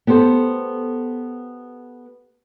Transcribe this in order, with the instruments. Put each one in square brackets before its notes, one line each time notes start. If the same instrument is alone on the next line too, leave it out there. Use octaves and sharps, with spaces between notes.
[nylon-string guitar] B3 G4 A4 C5